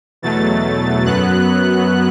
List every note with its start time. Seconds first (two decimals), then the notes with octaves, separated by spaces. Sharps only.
0.22 E2 B2 F#3 A3 A6
1.06 F#2 F#3 B3 F#6